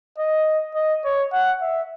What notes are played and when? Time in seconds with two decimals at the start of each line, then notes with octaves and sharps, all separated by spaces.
0.18 D#5
0.75 D#5
1.04 C#5
1.33 F#5
1.62 E5